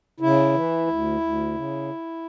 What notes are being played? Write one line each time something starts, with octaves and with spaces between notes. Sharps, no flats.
C#3 E4
E3
D2
D2
C#3